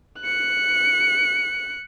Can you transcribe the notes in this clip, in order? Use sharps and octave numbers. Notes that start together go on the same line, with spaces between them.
F#6 C#7